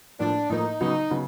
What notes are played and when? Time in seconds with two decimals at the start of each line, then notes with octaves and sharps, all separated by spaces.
0.19 A2 F3 A#3 D4
0.49 A2 F3 A#3 D#4
0.81 C#3 F#3 B3 D#4
1.10 C#3 F#3 B3